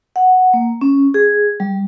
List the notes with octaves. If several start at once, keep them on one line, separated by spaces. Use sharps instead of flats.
F#5
A#3
C#4
G#4
G3